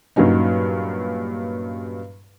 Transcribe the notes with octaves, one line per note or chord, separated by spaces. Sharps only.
G2 A#2 F#3 C#4 D#4